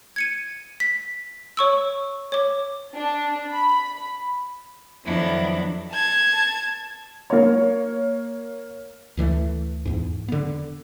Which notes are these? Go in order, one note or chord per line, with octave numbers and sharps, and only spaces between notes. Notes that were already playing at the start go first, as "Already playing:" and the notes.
G#6 C#7 D#7
B6
C#5 C#6 E6
C#5 D6
D4
B5
F2 D#3 F#3 B3 D4 E4
A5 G#6
A#3 C#5
D2 E3 G3 A3
E2 G#2
D3 B3